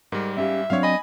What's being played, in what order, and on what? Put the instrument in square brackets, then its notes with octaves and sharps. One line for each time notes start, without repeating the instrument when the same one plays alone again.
[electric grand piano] G#2 G3 [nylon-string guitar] A#4
[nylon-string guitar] C#4 G4 F5 [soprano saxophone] E5
[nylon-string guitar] F#3 C4 D4 [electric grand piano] C#5 F5
[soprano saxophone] D#5 [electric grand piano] G#5 B5